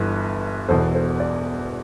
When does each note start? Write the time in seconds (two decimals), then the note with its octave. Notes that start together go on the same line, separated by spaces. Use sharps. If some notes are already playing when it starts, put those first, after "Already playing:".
Already playing: G1 G2 E3
0.68 E1 E2 B2 A4 C5
0.94 A4 C5
1.20 D5